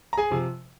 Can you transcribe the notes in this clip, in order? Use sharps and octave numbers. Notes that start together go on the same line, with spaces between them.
A#5
G#4 G#5
C3 F3